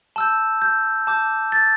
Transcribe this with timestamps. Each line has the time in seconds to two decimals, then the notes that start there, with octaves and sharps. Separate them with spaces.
0.16 A5 E6 G6
0.62 G6
1.07 A5 D6 G6
1.52 A6